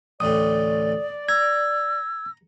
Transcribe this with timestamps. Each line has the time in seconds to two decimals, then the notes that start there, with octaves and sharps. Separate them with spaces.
0.20 A1 D2 A2 D5 D#6
1.29 A#5 E6 G#6